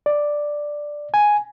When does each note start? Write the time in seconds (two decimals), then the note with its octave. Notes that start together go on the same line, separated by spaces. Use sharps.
0.06 D5
1.14 G#5